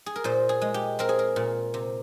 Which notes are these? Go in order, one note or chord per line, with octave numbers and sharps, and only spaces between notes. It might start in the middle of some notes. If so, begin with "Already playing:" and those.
G#4
A#4
A#2 C5
G#4
G#3
G4
C4 A#4
G#4
A#4
A#2
C3